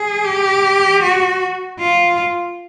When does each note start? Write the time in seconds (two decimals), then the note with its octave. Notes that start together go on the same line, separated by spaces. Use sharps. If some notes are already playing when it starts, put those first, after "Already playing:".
Already playing: G#4
0.24 G4
1.02 F#4
1.80 F4